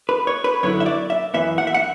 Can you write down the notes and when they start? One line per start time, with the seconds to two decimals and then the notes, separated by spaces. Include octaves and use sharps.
0.09 B4
0.27 C#5
0.44 B4
0.63 F#2 D3 F#3 B3 E4 C#5
0.80 E5
0.86 D5
1.10 E5
1.34 F#2 E3 B3 E5
1.58 F#5
1.67 E5
1.74 F#5